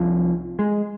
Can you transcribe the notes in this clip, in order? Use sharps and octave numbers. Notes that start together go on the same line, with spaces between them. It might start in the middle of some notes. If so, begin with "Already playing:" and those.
Already playing: C2 C3 F3
G#3